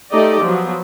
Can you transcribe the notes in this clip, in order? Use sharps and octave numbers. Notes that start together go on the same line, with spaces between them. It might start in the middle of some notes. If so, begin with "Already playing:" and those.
A3 D#4 G4 D5 D#5
F3 F#3 B3